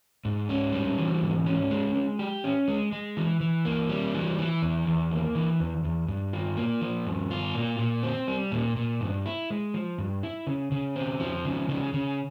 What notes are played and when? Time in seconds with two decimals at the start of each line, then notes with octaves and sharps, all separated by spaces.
0.25 G#2
0.49 C#4
0.73 G3
0.98 E3
1.22 G#2
1.46 C#4
1.71 G#3
1.95 G#3
2.19 G4
2.44 C#4
2.68 G#3
2.92 G#3
3.17 E3
3.41 E3
3.65 A#3
3.89 G3
4.14 E3
4.39 E3
4.62 E2
4.87 E2
5.11 A#3
5.35 E3
5.60 E2
5.84 E2
6.08 G2
6.33 F4
6.57 A#3
6.82 F3
7.06 G2
7.31 F4
7.55 A#2
7.79 A#2
8.03 C4
8.28 G3
8.52 A#2
8.77 A#2
9.01 G2
9.25 E4
9.50 G#3
9.74 F3
9.98 G2
10.23 E4
10.47 C#3
10.72 C#3
10.96 C4
11.20 F3
11.45 C#3
11.69 C#3
11.94 C#3